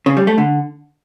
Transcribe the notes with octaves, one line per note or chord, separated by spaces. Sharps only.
C#3
G3
A3
D3